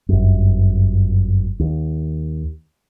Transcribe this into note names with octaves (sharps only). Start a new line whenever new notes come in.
G1 F#2
D#2